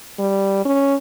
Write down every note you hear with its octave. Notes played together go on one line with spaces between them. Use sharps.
G3
C#4